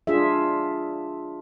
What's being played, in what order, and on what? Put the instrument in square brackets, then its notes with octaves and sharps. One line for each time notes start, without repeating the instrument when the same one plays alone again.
[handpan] D4 F4 G#4 E5